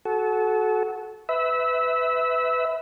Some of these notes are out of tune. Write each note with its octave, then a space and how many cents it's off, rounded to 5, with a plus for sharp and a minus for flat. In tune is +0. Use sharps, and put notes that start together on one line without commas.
F#4 +0 A4 -30
B4 +20 E5 -20